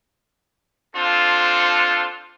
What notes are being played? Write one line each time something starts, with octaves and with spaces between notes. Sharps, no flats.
C4 D4 F4 A4